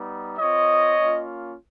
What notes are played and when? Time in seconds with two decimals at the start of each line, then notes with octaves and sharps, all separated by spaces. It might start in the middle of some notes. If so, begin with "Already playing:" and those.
Already playing: G3 B3 D#4
0.38 C4 F4 C#5 D#5
0.96 A#3 C#4 F4